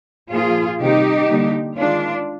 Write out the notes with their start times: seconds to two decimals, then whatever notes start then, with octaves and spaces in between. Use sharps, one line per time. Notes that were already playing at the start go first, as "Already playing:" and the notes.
0.31 A#2 F3 A#3 F4 G#4
0.80 C3 D#3 G3 A#3 D#4 G4
1.29 D3 G3 A#3
1.77 D#3 G#3 D4 F4